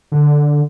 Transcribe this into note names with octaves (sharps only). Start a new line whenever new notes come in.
D3